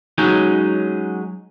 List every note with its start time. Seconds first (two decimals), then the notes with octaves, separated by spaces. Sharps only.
0.18 F#3 G#3 C#4 D#4